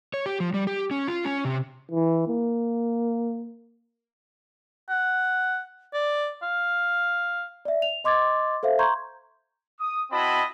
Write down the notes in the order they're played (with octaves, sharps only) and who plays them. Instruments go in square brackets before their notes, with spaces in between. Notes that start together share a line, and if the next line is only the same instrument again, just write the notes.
[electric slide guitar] C#5
G4
F3
G3
G4
C#4
F4
C#4
C3
[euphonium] E3
A#3
[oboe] F#5
D5
F5
[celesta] D5 E5
F7
D#5 C6 D6 G#6 A6
A4 C5 E5 F5
A#5 C6 C#6 G6 G#6
[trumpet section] D#6
C4 E4 F#4 D#5 A5 B5